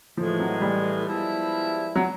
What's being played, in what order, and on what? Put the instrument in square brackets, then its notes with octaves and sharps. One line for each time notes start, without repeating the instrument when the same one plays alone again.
[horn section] A2 E3 G#3 [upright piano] F3
[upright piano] F#3
G3
[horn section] F3 G#3 B3 E4
[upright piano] F#3